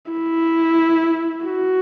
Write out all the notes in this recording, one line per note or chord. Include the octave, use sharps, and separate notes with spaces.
E4
F#4